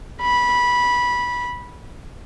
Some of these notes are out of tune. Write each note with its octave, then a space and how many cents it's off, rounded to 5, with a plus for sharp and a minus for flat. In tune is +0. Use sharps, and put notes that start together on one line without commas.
B5 -15